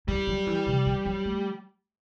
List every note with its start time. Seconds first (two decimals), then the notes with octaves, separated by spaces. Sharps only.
0.08 G3 E4
0.27 F#3
0.47 E3
0.66 C3
0.86 E3
1.05 F#3
1.25 A3